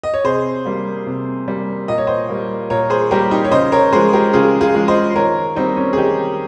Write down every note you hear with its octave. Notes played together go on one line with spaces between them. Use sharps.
D#5
C#5
C3 G#4 C5
G3 A#3
C3
G3 A#3
A#2 D#5
C#5
C5 D#5
G3 A#3
A#2 A#4 C#5
G#4 C5
G3 A#3 G4 A#4
D#4 G4
C#5
C#3 C5 D#5
A#4 C#5
F3 G#3 G#4 C5
G4 A#4
C#3 F4 G#4
F4 G#4
F3 G#3
C5 D#5
D#3 A#4 C#5
G3 A#3 C4 D#4
C#4
G#4
D#3 D#4 G4